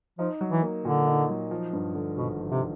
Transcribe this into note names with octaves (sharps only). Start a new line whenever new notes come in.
F3 D#4
F#3
E3
A#3
A#2 D3
D#4
F#3
F3
G2
D3
G#1 B2
F3
C3